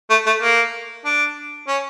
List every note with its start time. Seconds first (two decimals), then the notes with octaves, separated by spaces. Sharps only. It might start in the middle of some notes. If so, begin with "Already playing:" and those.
0.10 A3
0.26 A3
0.42 A#3
1.05 D4
1.67 C#4